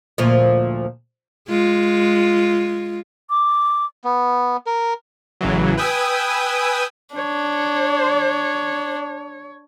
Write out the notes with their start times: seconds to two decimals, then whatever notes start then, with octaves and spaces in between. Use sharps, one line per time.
0.18 D2 A#2 F3
1.48 G#3 F4
3.30 D6
4.04 B3
4.67 A#4
5.41 A1 C#3 E3 F#3
5.77 B4 G5 G#5 D#6 E6
7.16 D4 C#5